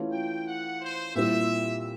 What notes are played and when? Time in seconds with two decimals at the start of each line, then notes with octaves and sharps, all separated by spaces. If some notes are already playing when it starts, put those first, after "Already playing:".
Already playing: E3 A3 C#4 F4
0.12 G5
0.48 F#5
0.81 C5
1.15 A#2 G3 C4 E4 G4 E5